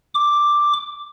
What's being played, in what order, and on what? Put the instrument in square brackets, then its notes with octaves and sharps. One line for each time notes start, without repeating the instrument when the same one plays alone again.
[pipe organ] D6